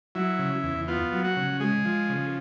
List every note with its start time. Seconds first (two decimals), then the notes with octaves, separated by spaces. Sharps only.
0.15 F#3 E4
0.39 C#3
0.63 E2
0.88 B3 F4
1.12 F#3
1.24 F#4
1.37 C#3
1.60 G#3 G#4
1.85 F3
2.09 C#3